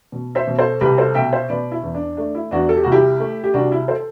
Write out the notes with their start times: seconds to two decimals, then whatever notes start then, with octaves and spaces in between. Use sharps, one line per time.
0.12 B2
0.35 C5 E5
0.47 B2
0.59 A4 C5
0.81 C2 G4 B4
0.98 A4 C5
1.15 B2 E5 G5
1.32 C5 E5
1.50 B2 B4 D5
1.72 E4
1.83 E2
1.95 D4
2.17 A3 D4
2.35 E4
2.51 E2 D4 F#4
2.69 A4
2.77 G4
2.84 C2 F#4
2.92 E4 G4
3.20 A3
3.44 G4
3.54 C2 D4 F#4
3.72 E4
3.88 A4 C5